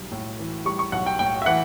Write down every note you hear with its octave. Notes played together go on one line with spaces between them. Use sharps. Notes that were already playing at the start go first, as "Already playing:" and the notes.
Already playing: B1 G3
A2
E3
G3 C#6
C#6
B1 F#5
G5
A2 G5
E5
E3 F#5